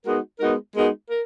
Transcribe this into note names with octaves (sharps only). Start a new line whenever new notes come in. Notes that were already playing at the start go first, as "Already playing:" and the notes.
G#3 B3 D#4 F#4 A#4
G#3 B3 D#4 F#4 A#4
G#3 B3 D#4 F#4 A#4
A#4